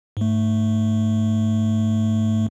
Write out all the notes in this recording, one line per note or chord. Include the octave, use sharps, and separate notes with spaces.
G#2 A3